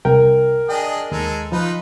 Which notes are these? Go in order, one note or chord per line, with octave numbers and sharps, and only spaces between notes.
C2 A#4 G5
D4 G#4 D#5 G5
D#2 G#3 A4 A#5
F3 D#4 F4 B4